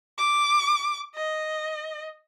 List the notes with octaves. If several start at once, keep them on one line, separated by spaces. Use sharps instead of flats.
D6
D#5